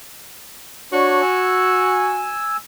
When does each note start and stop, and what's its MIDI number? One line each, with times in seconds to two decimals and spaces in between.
0.93 1.21 62
0.93 2.35 66
0.93 1.21 73
1.22 2.57 80
1.22 2.57 88